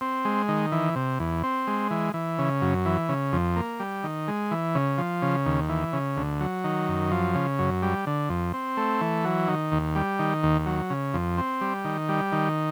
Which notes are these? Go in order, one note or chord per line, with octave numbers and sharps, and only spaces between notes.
C4
G#3
D#3
E3
C3
E2
C4
G#3
E3
E3
C#3
F#2
E3
C#3
F2
A#3
G3
D#3
G#3
E3
C#3
F3
C#3
D#2
E3
C#3
D2
F#3
D#3
F#2
F3
C#3
F#2
G3
D3
F2
C4
A3
E3
F#3
D#3
D#2
G3
D#3
D#2
F#3
C#3
F2
C4
G3
D#3
G3
D#3